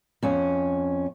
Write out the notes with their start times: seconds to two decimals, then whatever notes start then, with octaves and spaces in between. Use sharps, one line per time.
0.23 F2 C#4